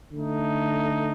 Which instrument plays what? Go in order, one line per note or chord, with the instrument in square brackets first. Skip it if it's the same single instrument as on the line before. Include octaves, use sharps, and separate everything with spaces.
[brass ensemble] D3 A3 D#4